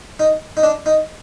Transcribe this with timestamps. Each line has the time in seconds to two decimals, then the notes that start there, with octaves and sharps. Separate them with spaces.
0.20 D#4
0.57 D#4
0.63 D4
0.86 D#4